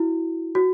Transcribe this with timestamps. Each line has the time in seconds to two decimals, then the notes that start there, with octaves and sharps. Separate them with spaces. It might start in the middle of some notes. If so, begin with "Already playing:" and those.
Already playing: E4 F#4
0.55 F#4